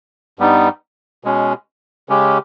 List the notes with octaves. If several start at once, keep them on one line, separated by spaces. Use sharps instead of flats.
G2 G3 B3 D#4
B2 G#3 C#4
C#3 G#3 C#4 G4